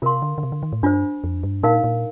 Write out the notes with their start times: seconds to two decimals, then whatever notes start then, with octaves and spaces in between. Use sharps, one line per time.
0.02 C3 F4 A#4 F5 C6
0.22 D3
0.38 D3
0.43 C3
0.52 D3
0.63 D#3
0.73 A2
0.83 G2 D4 F4 C5
1.24 F2
1.43 G2
1.63 A#2 D#4 A#4 F5
1.84 A#2